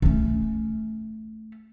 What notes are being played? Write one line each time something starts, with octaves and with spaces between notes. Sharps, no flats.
A3 C#4